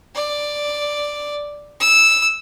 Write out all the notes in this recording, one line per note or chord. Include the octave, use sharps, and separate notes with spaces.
D5
E6